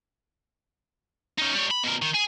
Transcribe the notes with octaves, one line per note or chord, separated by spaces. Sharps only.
C#4 D#4
G3 C#5
B5
B2 A#4
D#3
G#4